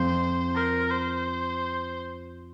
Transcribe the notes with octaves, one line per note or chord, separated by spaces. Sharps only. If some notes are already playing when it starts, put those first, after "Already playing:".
Already playing: F2 C5
A#4
C5